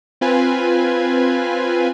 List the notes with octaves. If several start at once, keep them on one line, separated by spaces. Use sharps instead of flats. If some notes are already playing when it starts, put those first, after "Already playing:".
C4 F4 B4 G#5